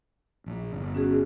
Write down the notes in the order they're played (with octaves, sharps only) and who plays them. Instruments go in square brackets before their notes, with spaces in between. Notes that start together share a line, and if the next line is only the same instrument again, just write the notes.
[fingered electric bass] A#1 A#2
G1
[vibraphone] C#4 F#4 G#4